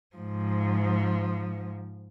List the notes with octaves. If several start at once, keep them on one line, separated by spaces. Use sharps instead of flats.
G#2 F3